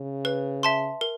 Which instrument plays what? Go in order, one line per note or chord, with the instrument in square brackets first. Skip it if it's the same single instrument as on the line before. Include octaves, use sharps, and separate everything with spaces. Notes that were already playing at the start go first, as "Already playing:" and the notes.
Already playing: [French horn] C#3
[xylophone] B4
E5 A5 C6
A#4